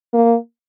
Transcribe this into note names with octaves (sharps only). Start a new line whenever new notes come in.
A#3